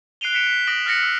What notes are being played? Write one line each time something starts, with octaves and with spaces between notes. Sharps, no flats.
F#6 C7 D7 D#7 F7 G7
F#6 B6 C#7 D7 E7
B6
D#6 A#6 B6 D7 E7 F#7
F6 F#6 A6 A#6 C#7 F#7
E6